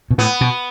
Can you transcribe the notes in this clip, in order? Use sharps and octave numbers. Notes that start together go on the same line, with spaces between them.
B2
A2 B3
B2